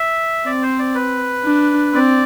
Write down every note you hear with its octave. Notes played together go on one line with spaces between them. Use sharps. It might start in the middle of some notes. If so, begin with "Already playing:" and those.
Already playing: E5
C4 D5
C5
D5
B4
D4
C4 D5